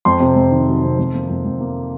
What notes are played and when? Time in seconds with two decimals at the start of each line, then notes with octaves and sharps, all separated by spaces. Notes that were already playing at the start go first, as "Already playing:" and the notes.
0.05 F2 C6
0.20 C3
0.36 F2
0.52 D#3
0.68 F#3
0.83 C3
0.99 F2
1.14 A#3
1.30 F2
1.45 F2
1.60 A#3